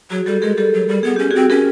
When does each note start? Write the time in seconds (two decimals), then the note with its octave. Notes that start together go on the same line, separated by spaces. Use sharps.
0.10 F#3 F#4 G#4
0.26 G3 G4 A4
0.42 G#3 G#4 A#4
0.57 G3 G4 A4
0.73 F#3
0.88 G3
1.03 B3 G#4
1.16 C#4 G4
1.31 C4 F#4 G#4
1.50 C#4 G#4 A#4